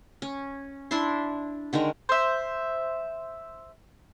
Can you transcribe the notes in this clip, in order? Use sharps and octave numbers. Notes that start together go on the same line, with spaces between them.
C#4
D4 E4 E5 C6
D3 D#3 G#3 A#4
C5 E5